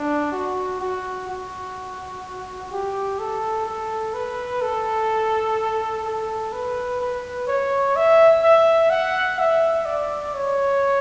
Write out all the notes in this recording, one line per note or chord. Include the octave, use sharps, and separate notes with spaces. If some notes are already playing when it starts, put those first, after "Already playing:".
Already playing: D4
F#4
F#4
F#4
G4
A4
A4
B4
A4
A4
B4
B4
C#5
E5
E5
F#5
E5
D5
C#5